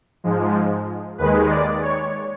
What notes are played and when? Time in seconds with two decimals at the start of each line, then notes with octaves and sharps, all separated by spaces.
0.24 G#2 F3 G#3
1.18 D#2 D#3 G#3 B4
1.50 D5
1.82 C#5